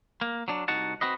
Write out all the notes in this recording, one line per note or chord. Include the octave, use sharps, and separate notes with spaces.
A#3
F#3 D4
C2 D#4 F#4 F#5 A5
C4 F#4 B4 D#5